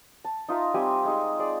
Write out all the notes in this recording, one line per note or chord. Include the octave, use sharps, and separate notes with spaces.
A5
D#4 F4 E5 A#5
G3 C4 G4 G#5
G#3 D#4 C5
G#4 D5